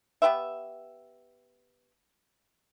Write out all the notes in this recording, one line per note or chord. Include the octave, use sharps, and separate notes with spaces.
B3 G4 B4 E5